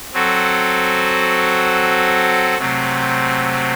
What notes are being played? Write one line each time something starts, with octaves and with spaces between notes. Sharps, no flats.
F#3 C4 F#4 A4
C3 F#3 A3 C4